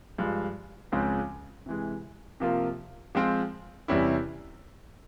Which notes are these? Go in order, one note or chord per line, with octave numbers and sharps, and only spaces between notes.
G2 F3 G#3
C#2 C#3 F3 G#3 C4
C3 E3 G#3
C3 F3 A#3 F4
F3 G#3 C4 F4
E2 C3 G3 C#4 E4